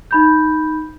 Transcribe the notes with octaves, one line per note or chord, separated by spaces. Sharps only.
D#4 B5 G6